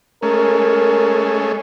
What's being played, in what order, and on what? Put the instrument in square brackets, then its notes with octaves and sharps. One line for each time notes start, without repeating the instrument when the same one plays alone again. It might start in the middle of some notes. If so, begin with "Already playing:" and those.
[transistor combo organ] G#3 A3 C#4 [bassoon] A#4